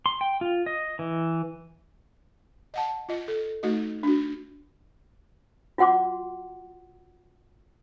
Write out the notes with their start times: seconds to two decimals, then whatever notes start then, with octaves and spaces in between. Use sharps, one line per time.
0.06 C6
0.21 G5
0.41 F4
0.66 D#5
0.99 E3
2.74 D#5 F#5 A5
3.09 F4 D#5
3.28 A4
3.63 A3 D#4 F#4 D#5
4.03 D4 F#4
5.78 F4 F#4 F#5 C6 D6